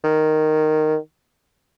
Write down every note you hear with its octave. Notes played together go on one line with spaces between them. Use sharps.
D#3